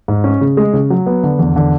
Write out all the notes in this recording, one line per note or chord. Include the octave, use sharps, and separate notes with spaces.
G#2
C#4
C#3
G#3
C#3
F#3
B3
D3
E2
D3